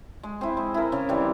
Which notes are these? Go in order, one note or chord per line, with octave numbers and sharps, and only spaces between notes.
G#3
C4 E4
G#3
E4 A#4
C#3
E3 G3 C4